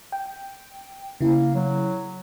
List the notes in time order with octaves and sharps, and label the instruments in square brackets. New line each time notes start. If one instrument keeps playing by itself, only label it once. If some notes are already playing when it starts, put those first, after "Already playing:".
[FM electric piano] G5
[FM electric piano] C#3 E4 [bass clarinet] A#3
[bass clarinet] F#3